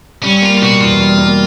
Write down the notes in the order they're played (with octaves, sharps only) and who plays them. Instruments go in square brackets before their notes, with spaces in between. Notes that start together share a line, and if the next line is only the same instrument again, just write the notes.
[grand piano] G3 [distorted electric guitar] C#4
[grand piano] A#3 [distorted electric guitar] F4
[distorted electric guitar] F4
[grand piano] B2 [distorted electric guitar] F#4
[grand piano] E2 [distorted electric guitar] F4
[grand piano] G3
A#3